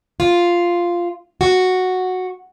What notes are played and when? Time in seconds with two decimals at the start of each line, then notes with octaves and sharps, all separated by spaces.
0.20 F4
1.41 F#4